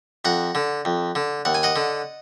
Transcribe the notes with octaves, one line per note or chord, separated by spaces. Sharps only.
F2 F#5 A#5
D3
F2
D3
D#2 F#5
G#5
D#5 F#5
D3